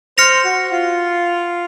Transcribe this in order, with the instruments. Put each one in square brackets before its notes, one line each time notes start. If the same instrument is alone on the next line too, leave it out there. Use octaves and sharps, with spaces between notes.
[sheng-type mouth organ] C5 [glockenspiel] F6 A#6 C#7 F7
[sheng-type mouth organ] F#4
F4